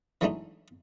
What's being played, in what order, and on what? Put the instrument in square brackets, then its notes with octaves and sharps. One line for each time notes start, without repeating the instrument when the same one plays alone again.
[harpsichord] E3 F#3 G#3 A3 D4 D#4